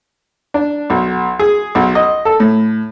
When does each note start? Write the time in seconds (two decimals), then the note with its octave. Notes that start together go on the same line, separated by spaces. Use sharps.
0.54 D4
0.90 B1
1.39 G#4
1.75 B1
1.95 D#5
2.25 A4
2.40 A2